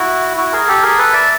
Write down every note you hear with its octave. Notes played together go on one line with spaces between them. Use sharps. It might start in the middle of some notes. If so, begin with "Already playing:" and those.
Already playing: E4 F#4
E4 F#4
G#4 A#4
G4 A4
G#4 A#4
A4 B4
D5 E5